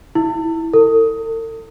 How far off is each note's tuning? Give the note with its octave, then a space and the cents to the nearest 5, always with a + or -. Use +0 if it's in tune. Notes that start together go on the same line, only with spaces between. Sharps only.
E4 -10
A4 +45